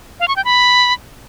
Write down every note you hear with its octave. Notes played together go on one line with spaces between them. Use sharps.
F5
C#6
G5
B5